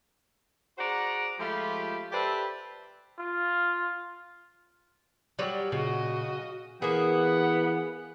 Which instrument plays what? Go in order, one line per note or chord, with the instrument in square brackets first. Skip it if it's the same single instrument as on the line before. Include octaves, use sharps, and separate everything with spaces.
[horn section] F#4 G#4 C5 D5 F#5 A#5
F3 G#3 A3 F4 G4 B5
G4 A4 B4 C5 D5 E5
[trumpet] F4
[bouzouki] F#3 G3 [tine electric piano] G4 D5
[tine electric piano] A#2 [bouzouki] C#3 [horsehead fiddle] F#4 D#5
[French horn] E3 [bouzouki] A#3 G#4 [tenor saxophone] B3 [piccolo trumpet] F#5